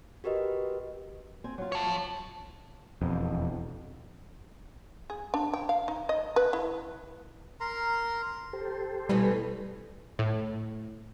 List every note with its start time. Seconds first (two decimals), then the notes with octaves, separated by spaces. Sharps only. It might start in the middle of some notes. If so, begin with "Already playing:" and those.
0.24 F#4 G4 A#4 B4 D#5
1.44 C4 G#5
1.58 F#3 F4
1.72 C#5 A5
1.86 F3
3.01 E1 F2
5.10 G#4
5.34 D4
5.53 G5
5.69 F5
5.88 D#4
6.09 D#5
6.36 B4
6.53 E4
7.60 A#4 A#5 C6
8.53 G4 A4 C5
9.09 B2 E3 G3 A3
10.19 A2